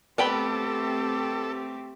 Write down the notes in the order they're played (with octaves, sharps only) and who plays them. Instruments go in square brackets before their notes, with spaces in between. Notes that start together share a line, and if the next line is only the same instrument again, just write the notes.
[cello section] A3 C4 G4 [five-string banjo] B3 G5 B5 [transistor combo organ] A4